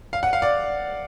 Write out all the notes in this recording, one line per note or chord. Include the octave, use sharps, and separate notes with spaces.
F5
F#5
F5
D5